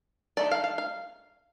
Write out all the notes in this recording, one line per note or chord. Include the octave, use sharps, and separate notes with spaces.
D#3 A3 D#4 D5
F5
F5
F5